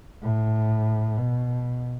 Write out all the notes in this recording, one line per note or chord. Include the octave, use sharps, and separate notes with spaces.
A2
B2